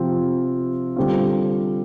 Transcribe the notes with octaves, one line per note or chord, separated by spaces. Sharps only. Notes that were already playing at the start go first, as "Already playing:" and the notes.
Already playing: C3 F3 C4 F4
D3 G3 C4 F4